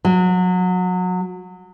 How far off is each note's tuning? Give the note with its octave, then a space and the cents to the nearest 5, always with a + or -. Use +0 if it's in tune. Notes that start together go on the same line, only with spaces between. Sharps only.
F#3 -25